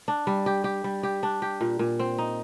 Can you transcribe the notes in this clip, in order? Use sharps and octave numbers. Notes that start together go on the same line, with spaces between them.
D4
G3
G4
G4
G3
G4
D4
G4
A#2
A#2
C4
D#4